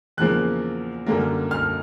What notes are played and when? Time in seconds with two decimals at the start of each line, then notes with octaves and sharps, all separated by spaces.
0.17 E2 C#3 F3 A#3 F#6
1.06 F#2 D3 G3 A#3
1.51 F6